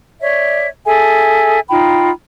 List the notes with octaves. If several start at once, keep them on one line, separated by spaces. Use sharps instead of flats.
C#5 D5 E5
G#4 A4 E5 G#5
D#4 F4 G5 B5